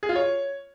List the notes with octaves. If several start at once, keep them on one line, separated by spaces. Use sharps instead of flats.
G#4
F4
C#5